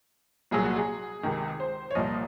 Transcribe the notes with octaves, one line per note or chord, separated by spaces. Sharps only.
C2 A#2 F#3 G#4
F#4
G#4
C#2 C3 D#3
C5
C#5
C2 A#2 F3 D#5